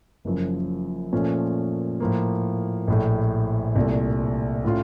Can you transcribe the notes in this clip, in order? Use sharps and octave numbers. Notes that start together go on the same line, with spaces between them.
F#1 F#2 F3
A#2 F3 A3 C#4
A2 F3 A#3
A#1 A2 A3
C2 A#2 A3
A2 A3 C#4 F4